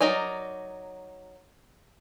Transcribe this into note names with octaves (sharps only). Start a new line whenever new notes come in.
F#3 D#4 A#4 D5